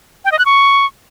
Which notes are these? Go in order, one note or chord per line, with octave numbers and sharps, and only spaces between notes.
G5
D#5
F#6
C#6